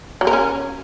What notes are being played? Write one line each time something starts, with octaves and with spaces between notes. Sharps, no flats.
F#3
A#4
C#4